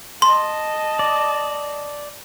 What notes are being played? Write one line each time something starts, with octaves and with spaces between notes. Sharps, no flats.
D#5 A5 C6
D5